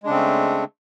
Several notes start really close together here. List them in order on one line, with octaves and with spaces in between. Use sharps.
G#3 D4 C#3 C4 A3